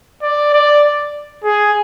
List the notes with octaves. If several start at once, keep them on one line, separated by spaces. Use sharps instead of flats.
D5
D5
G#4